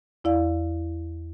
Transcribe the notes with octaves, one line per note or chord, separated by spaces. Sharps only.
E2 E4 D5 F5